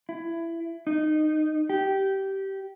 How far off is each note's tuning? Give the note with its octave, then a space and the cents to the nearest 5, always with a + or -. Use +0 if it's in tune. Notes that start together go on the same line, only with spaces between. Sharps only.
E4 +20
D#4 -15
G4 -15